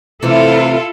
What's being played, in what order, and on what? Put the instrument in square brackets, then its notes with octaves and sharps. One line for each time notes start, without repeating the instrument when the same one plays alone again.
[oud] C3 E3 A3 [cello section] E4 F4 A4